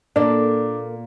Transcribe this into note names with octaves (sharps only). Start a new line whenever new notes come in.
A#2 A#3 D4 A4 A#4